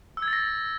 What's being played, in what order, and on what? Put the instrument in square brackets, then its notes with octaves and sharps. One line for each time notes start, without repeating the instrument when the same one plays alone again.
[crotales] E6
G#6
A6
A#6